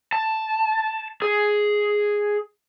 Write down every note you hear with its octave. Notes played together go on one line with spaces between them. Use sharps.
A5
G#4